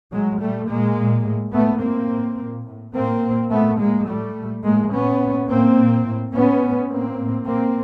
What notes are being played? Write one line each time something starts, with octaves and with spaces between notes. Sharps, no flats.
A2 F#3 G#3
A#2 G3 A3
A#2 G#3 A#3
A#2
A2
A2 A3 B3
A2 A#3 C4
A2
A#2
A2
A2 A#3 C4
A#2
A#2 A3 B3
A2 G#3 A#3
A2 G3 A3
A#2
A2 G#3 A#3
A#2 B3 C#4
A#2
A2 A#3 C4
A#2
A2
A2 B3 C#4
A2
A2 A#3 C4
A2
A#2 A#3 C4